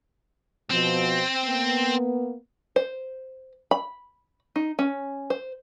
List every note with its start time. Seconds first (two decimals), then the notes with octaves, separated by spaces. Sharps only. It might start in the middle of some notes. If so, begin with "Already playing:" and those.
0.71 B2 F3 C4
1.44 A#3 B3
2.76 C5
3.71 B5
4.56 D#4
4.79 C#4
5.30 C5